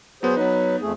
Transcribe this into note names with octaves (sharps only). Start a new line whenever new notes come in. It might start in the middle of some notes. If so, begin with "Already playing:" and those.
F#3 B3 G#4 C5
F#3 B3 D#4 B4
F2 A3 G#4